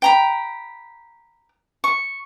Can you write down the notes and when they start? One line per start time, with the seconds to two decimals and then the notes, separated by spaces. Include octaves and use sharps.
0.02 G5 A#5 B5
1.84 C#6